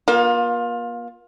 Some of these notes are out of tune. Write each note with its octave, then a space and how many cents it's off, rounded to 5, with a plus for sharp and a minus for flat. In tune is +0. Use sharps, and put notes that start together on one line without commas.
A#3 +40 F4 +20